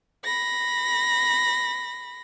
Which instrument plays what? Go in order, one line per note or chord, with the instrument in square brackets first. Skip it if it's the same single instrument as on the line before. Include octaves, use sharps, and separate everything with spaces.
[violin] B5 A#6